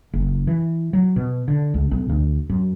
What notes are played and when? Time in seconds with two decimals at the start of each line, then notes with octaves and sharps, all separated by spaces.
0.14 F#1
0.47 E3
0.93 F#3
1.16 B2
1.48 D3
1.74 C#2
1.91 B1
2.09 D2
2.50 F#2